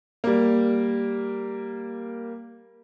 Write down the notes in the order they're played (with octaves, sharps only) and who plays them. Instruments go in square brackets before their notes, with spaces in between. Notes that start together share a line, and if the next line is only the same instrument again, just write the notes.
[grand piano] G3 A#3